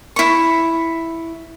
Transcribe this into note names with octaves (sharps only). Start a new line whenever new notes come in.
E4 C#6